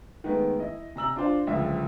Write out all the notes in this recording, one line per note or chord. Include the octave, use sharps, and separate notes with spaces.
D#3 G#3 A3 B3 B4
E4 D#5
C3 A#5 E6 F#7
D4 F4 C5 F5
D1 C#2 F3 E5